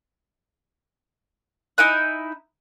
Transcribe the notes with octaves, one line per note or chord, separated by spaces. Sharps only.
D#4 E4 G#5 F#6